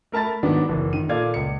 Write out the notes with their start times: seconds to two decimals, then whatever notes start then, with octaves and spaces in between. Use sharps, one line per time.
0.12 A3 A#4 A5 B5 A6
0.43 G#2 D#3 F#3 B3 D4
0.69 F#1 E3
0.93 D#3 D#7
1.09 A#2 A4 D5 F5 G#6
1.34 C#2 C#7